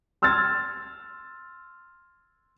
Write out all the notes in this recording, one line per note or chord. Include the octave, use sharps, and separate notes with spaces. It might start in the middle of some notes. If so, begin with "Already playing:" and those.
C6 E6 F6 G#6 A6